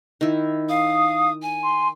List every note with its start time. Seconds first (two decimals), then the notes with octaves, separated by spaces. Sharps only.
0.21 D#3 E4
0.69 F5 D#6
1.42 G#5
1.63 C6